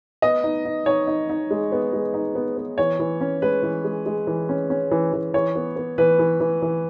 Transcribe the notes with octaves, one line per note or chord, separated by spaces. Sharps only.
B3 D#5
D#4
D#4
D#4 C#5
D#4
D#4
G#3
B3
G#3
D#4
B3
B3
E3 C#5
E3
C#4
G#3 B4
E3
G#3
G#3
E3
C#4
C#4
E3
E3
E3 C#5
B3
B3
E3 B4
E3
E3
E3